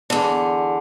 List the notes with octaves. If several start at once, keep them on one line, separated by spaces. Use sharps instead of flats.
E2 D3